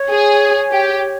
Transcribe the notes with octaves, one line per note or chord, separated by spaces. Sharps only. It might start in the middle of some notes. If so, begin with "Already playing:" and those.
Already playing: C#5
G#4
G4